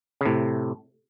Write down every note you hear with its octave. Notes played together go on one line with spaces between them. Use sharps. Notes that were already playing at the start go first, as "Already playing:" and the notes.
C#3
A2 C3